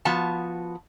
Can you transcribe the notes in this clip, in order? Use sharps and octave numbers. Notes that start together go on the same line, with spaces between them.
F3 B3 F#4 A5